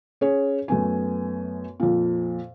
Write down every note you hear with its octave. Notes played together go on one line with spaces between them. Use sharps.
C#4 G#4 C#5
F#2 A3 B3 G#5
F2 A#2